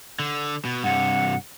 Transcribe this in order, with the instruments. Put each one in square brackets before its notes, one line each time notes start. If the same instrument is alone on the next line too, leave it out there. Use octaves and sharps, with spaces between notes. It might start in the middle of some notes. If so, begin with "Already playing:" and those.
[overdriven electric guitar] D3
B2
[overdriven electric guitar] G2 C3 [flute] F#5